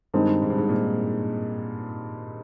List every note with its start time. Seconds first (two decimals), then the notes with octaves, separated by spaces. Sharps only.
0.14 G2 D#3 G#3 C4 D#4
0.42 G#2
0.50 G2
0.58 G#2
0.69 A#2